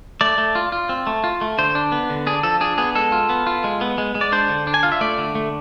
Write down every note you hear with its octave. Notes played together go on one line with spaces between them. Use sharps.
A3 D5
A3
F4
F4
C4
A3
F4
A3
D3 C5
D4
B3
D3
D4 G#4
F3 A4
D4 G#4
B3 G#4
G#3 A4
F4
B3
F4
G#3
B3
G#3
G#3
D5
D4 C5
D3
D4
G#5
F4 F5
E5
A3 D5
D3
A3